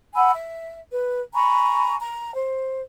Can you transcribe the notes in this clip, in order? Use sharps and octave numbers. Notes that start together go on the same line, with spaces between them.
F#5 G#5 B5 E6
E5
B4
G#5 A#5 B5 C#6
A#5
C5